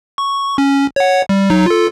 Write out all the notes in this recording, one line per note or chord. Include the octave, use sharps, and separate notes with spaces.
C#6
C#4
C#5 F#5
G3
F#3 D#4
F4 A4